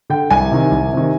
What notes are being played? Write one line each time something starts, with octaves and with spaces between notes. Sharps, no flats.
D3 G5
C2 G#5
C3 D#3
C2
C3 D#3